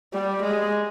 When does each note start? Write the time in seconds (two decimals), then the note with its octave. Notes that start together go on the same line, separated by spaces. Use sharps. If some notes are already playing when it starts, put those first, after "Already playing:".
0.14 G3
0.43 G#3